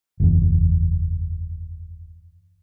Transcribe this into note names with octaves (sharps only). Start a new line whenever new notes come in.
F#1 E2